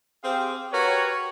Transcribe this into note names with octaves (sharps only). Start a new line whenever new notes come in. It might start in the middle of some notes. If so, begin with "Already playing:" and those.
C4 G4 G#4 C5 F5
F#4 G4 A#4 B4 C#5